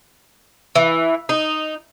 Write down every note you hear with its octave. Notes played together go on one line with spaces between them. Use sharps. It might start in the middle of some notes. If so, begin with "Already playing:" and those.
E3
D#4